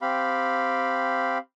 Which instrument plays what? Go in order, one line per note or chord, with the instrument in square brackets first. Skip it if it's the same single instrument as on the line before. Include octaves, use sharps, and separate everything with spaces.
[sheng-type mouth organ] C4 G4 F5 B5